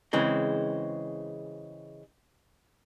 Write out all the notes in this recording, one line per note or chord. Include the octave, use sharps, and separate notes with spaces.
C#3 E3 G#3 C4